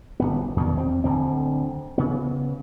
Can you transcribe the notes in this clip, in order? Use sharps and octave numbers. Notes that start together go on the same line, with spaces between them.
G1 C#2 B3
E2 G2 B2 D#3
E2 C4
D1 D3 C4
C#3 B3